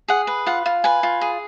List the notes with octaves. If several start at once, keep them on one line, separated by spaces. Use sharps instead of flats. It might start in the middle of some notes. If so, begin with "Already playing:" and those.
G#4 F#5
B4
F4 F#5
F4
B4 G#5
F4
G#4